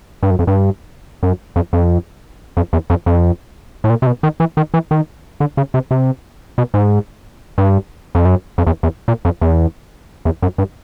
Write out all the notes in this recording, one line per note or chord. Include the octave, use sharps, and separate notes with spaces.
G2
F#2
F2
G2
F#2
F2
F2
F2
E2
F2
F2
A2
A#2
C3
B2
D#3
E3
D#3
E3
D#3
D3
C#3
C3
C3
B2
G#2
G2
F2
F#2
F2
E2
E2
A#2
F2
E2
E2
F#2
G2